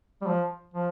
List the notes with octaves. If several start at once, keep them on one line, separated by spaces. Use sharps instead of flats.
G3
F3
F3